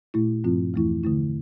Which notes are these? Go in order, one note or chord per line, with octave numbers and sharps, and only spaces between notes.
A#2 A3 E4
G2 F3 C4 F4
E2 E3 A3 E4
D3 A3 E4